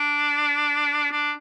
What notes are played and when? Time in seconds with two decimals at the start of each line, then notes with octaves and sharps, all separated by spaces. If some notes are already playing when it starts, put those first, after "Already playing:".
Already playing: D4
1.11 D4